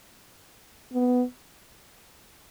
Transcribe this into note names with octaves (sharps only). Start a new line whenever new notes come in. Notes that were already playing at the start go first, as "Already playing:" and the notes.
B3